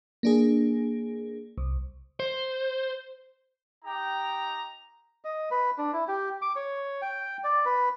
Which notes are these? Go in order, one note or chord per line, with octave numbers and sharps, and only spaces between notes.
A#3 D4 G#4
C2
C5
D#4 G4 G5 A#5
D#5
B4
D4
E4
G4
D6
C#5
G5
D5
B4